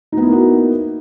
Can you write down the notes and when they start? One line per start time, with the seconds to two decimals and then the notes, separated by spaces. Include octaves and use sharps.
0.12 D#4
0.17 B3
0.22 E4
0.27 A#3
0.32 F#4